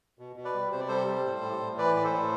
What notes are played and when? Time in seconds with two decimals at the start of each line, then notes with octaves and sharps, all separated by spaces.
0.19 B2
0.36 B2
0.45 B4 D5
0.54 G3
0.71 C3 C5
0.80 D5
0.88 G3 A4 C5
1.07 G3
1.24 A2
1.42 A2
1.60 A2
1.78 E3 B4 D5
1.95 A2 D5
2.04 A4 C5
2.13 A2